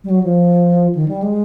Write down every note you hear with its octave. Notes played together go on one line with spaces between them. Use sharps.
G3
F#3
F3
D#3
G3
G#3